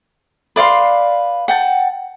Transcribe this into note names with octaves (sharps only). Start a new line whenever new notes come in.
B4 D5 F5 C6
F#5 G5 A5